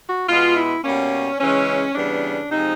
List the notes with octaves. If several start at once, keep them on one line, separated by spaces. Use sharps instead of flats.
F#4
B2 G#3 B3 F4
E4
B2 G3 A#3 C#4
C#3 E3 G#3 C#4
C#3 E3 G3 B3 D4
C3 F3 G#3 D#4